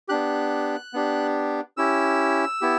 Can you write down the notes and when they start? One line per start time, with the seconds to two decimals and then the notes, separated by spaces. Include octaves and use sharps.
0.09 B3 D4 G4 F#6
0.93 B3 D4 G4
1.77 C#4 E4 G4 E6
2.61 B3 E4 G4